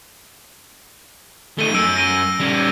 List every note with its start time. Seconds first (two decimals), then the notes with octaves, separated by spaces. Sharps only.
1.59 A3 D#4 D#7 G7
1.74 F#2 E6 D7
1.97 A#6 D#7 G7
2.40 G3 C#4